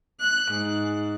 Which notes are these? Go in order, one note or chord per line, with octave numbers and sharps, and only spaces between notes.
F#6
G#2